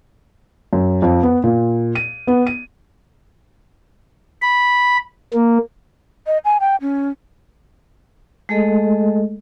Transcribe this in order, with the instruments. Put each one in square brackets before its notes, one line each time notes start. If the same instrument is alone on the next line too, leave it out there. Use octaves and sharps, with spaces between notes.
[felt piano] F#2
F2
B3
A#2
D#7
B3
D#7
[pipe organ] B5
A#3
[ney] D#5
G#5
G5
C#4
[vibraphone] G#3 A3 G#4 A4 D#5